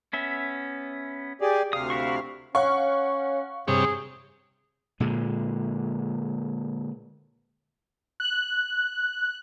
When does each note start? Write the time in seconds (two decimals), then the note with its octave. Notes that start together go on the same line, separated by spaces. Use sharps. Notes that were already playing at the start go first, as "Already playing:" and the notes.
0.13 B3 C#4 E5
1.41 G4 G#4 D5
1.73 D2 C3 F5 D#6
1.90 E4 F#4 C#6
2.55 C#4 C#5 F5 F#5 C#6
3.68 G2 C3 G#4 C#5
5.00 A#2 D3 G#3
8.20 F#6